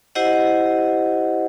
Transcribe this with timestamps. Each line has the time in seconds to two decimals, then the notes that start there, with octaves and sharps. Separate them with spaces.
0.15 E4 G4 C5 D#5 F#5